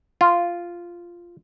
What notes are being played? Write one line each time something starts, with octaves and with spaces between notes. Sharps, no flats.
F4